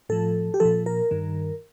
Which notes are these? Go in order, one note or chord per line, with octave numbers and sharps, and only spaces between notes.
A2 F3 A4
G4
A#2 F3 A4
A#4
G2 D#3